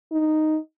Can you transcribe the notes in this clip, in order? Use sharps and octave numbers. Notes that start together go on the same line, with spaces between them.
D#4